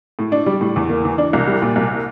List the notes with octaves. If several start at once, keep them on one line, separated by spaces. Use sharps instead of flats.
A2
D4
G3
A2
E2
A#3
E3
D4
C2
G3
A#2
C2